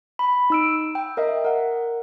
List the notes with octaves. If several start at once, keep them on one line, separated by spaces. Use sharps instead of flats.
B5
D#4 E6 D7
G5
A#4 D#5 E5
A#4 F#5